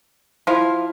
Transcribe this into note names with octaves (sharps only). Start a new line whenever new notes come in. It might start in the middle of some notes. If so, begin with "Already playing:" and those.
F3 E4 F5